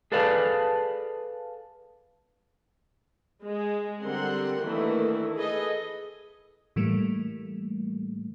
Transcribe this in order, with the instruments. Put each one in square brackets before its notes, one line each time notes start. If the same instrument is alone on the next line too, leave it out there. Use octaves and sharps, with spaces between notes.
[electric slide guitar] G#4 A4 B4 D5 F5 A5
[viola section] G#3
D3 G3 C4 A#4 F#5 C6
D#3 E3 A3 A#3 D4 E4
G#4 A4 B4 D#5
[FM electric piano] A2 E3 G3 A3 A#3